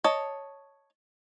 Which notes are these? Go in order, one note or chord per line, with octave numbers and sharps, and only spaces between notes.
C#5 D#5 A5